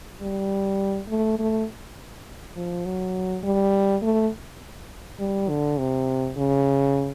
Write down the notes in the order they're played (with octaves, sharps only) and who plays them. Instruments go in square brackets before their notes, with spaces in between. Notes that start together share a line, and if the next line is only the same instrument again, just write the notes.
[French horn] G3
A3
A3
F3
F#3
G3
A3
G3
D3
C3
C#3